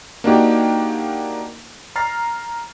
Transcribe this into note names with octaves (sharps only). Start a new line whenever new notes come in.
A#3 D4 D#4 F#4 G4
A#5 F6 A6 C7